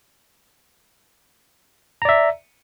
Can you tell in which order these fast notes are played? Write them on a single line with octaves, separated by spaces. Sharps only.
A#5 D5 E5